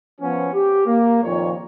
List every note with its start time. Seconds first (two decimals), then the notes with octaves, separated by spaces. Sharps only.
0.21 F3 B3 C#4
0.54 G4
0.86 A#3
1.23 F2 A#2 D#3 F3 C#5